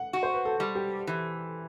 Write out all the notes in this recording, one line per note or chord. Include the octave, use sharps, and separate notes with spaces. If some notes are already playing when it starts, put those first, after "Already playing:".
Already playing: F#5
F#4
C5
B4
A4
G3
G4
E3